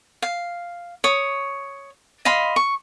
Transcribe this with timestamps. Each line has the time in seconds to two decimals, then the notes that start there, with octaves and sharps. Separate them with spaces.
0.22 F5
1.04 C#5 D#6
2.25 D#5 F5 B5 C6
2.56 C#6